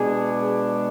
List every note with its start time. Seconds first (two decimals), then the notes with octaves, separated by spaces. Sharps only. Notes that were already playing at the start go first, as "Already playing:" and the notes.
Already playing: B2 G#3 D4 G#4